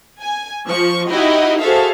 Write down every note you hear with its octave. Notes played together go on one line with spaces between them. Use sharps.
G#5
F3 C#6
D#4 E4 F#4 G4 D#5
F#4 G#4 A4 C5 E5 F5